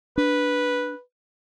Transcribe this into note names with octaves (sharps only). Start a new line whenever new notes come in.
D4 B4